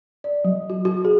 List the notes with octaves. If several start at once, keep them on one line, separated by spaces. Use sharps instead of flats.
D5
F#3
F#4
F#4
G#4